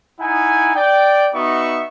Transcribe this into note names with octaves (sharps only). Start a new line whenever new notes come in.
D#4 E4 F#5 G#5
D5 G5
B3 D#4 F#4 E5 C#6